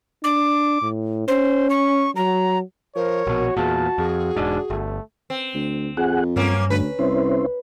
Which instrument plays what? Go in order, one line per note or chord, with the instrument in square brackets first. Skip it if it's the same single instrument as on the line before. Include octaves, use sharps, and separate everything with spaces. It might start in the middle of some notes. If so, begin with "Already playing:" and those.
[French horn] D4 [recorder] D6
[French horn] A2
[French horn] C#4 [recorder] C5
[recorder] C#6
[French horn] F#3 [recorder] A#5
[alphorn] F3 [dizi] A#4 [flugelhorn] C#5
[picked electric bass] A#1 B2 [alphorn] F#4
[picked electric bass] E2 A#2 [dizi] G#4 [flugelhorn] A5
[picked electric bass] F2 [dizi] G#4
[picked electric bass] E1 G#2 [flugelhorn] D4
[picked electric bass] G1 [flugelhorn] A3
[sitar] C4
[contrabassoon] D2
[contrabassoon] F2 [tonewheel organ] G#4 F#5
[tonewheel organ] G2 [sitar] F#3 A#3 C#4
[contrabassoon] D2 [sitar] B4
[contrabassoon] C2 [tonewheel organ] C#4 E4 C5